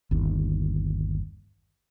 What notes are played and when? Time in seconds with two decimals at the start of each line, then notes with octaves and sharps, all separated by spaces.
0.11 G1 D#2